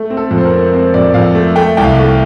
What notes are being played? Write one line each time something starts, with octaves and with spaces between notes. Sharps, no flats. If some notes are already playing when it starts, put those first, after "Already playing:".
Already playing: A3
C4
A4
F2
C5
A#4
C4
C4 C5
F2 D5
F2 F5
A3
A3 G5
C2 G5
F5
A3